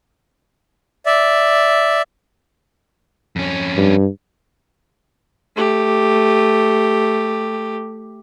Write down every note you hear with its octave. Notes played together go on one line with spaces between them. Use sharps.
D5 E5
F2 C#4
G2
A3 G4